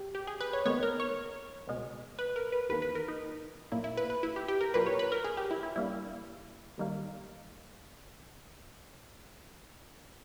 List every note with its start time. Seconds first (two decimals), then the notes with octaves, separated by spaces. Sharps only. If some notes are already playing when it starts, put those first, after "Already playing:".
Already playing: G4
0.15 G4
0.27 G#4
0.40 B4
0.53 C#5
0.65 D#2 D#3 G#3 B3 C#5
0.83 A#4
1.00 C#5
1.68 C#2 B2 G#3
2.19 B4
2.36 A#4
2.52 B4
2.69 E2 D#3 A#3 B4
2.82 B4
2.95 A#4
3.08 D#4
3.72 B1 A#2 A#3 E4
3.84 E4
3.97 B4
4.10 B4
4.23 E4
4.36 G4
4.48 G4
4.61 A#4
4.74 B1 A#2 A#3 B4
4.86 C#5
4.99 B4
5.12 A#4
5.24 G#4
5.37 G4
5.51 E4
5.63 E4
5.76 G1 G2 G3 A#3 E4
6.78 D#2 D#3 G3 A#3